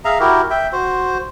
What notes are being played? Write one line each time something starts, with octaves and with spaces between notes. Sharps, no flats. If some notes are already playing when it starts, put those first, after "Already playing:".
G#4 E5 F5 A#5
E4 F#4 G4 A#4
E5 G5
F#4 C5